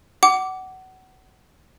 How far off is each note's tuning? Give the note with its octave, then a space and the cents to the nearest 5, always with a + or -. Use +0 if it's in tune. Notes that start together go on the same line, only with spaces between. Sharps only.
F#5 +25 D6 -10